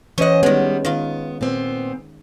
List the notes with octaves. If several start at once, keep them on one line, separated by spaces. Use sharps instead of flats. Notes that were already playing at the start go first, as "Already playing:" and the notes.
E3 C#4 C5 D#5 F#5
D#3 G3 G#3 B3
D#3 B3 F4
A#2 B3 C4